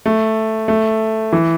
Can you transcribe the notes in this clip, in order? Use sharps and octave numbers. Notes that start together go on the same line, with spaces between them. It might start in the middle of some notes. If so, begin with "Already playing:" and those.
A3
A3
E3